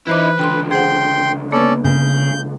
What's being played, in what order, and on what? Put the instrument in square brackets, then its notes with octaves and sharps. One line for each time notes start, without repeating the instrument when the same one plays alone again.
[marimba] E3 C5 D6 [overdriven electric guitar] D#4 E4 [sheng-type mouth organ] B4
[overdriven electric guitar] C#2 D3 [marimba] G5 B5 C6
[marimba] G#4 C5 F#5 [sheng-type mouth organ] G5 C6
[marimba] A#3 B3 B4 [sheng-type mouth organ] C#4 A4 D5
[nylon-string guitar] C#3 [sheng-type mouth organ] G6